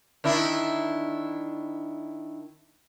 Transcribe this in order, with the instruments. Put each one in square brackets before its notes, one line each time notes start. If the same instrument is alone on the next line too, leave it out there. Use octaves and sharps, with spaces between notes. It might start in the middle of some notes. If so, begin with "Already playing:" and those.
[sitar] D#3 D4 E4